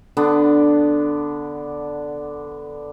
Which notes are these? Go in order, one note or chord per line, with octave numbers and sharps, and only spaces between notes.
D3 B3 D4